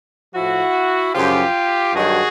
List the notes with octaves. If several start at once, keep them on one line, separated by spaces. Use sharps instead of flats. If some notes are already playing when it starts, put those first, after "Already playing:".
A2 F3 E4 F#4
F#2 C#3 F3 F4 G4
G2 D#3 F#3 F#4 G#4